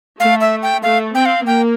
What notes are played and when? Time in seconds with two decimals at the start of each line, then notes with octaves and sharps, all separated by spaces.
0.20 A3 F5
0.41 E5
0.63 G5
0.83 A3 F5
1.15 C4 G5
1.26 F5
1.46 A#3 G5